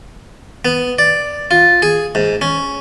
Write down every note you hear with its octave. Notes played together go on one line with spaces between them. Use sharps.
B3
D5
F4
G#4
G#2
C#4